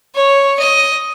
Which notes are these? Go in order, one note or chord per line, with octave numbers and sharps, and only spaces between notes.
C#5
D#5